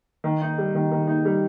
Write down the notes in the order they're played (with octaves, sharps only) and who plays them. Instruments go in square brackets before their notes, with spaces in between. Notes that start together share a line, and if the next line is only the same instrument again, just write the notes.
[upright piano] D#3
D#4
G3
D#3
D#3
D#4
G3